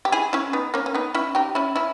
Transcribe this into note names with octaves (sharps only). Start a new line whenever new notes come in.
G4
E4 G#4
C#4 E4
B3 D#4
A#3 C#4
C#4
B3 D#4
C#4 E4
D#4 G4
C#4 E4
C#4 E4